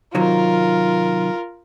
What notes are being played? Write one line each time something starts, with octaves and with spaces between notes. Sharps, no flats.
C3 D#3 F#3 F4 A#4